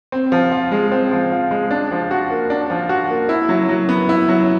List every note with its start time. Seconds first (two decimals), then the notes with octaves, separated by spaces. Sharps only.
0.12 C4
0.32 F3
0.52 F4
0.71 G#3
0.92 C4
1.12 F3
1.32 F4
1.51 G#3
1.71 D4
1.91 F3
2.11 F#4
2.31 A#3
2.50 D4
2.70 F3
2.89 F#4
3.10 A#3
3.29 E4
3.49 F#3
3.69 F#3
3.89 B3
4.09 E4
4.29 F#3